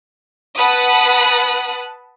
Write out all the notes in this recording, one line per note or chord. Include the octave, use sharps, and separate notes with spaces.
B4 F#5 A5 B5 D#6 F#6